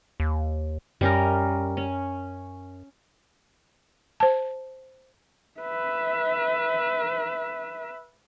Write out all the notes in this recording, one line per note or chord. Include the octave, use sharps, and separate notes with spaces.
D#2
F#2 G3 C#4 A#4
C#4
C5 A5
B4 E5